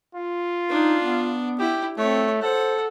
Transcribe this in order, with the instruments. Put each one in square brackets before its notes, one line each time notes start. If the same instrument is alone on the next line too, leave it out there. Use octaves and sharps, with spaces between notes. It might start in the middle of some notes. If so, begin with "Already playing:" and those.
[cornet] F4
[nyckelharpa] D4 [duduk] D#4
[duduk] B3
[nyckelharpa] E4 [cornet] G4
[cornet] A3 [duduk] C4 [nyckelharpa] C#5
[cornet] A4 [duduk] C5 [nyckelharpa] F#5